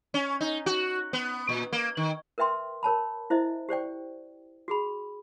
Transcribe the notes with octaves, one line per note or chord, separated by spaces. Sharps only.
C#4
D#4
F#4
B3
A#2
A#3
D#3
A#4 B4 E5 G5 C6
A#4 C#5 A5 B5
E4 C5 D#5 E5
G4 C5 D5 G5
F#4 G#4 B5